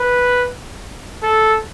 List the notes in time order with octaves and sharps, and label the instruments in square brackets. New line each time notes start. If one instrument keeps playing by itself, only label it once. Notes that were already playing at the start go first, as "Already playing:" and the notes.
Already playing: [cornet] B4
A4